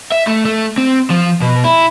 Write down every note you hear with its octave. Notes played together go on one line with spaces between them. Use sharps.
E5
A3
A3
C4
F3
B2
E4